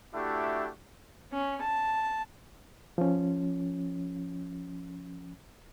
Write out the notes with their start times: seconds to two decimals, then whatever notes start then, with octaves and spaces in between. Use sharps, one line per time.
0.14 A3 D4 E4 F#4 G4
1.32 C#4
1.62 A5
2.98 F3 C#4